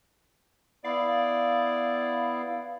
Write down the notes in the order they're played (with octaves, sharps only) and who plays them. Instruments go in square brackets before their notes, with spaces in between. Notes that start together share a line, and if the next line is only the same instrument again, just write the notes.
[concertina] B3 E4 [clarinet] D5 [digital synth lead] F5